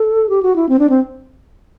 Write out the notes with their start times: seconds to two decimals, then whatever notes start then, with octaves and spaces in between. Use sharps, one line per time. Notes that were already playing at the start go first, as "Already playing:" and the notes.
Already playing: A4
0.29 G4
0.43 F#4
0.56 E4
0.69 C4
0.79 D4
0.90 C4